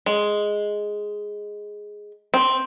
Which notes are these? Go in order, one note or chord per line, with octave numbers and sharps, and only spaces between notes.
G#3
C4